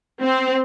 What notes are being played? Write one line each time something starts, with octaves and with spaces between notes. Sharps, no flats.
C4